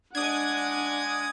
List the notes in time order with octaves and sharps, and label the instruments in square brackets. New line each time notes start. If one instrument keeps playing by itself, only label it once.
[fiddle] G#3 D5 [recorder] D4 [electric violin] F#5 [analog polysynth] D#6 G#6